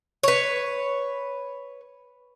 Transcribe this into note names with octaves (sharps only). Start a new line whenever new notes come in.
B4 C#5